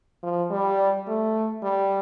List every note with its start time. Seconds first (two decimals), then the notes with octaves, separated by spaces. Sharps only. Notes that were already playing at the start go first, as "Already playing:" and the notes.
0.23 F3
0.51 G3
1.08 A3
1.63 G3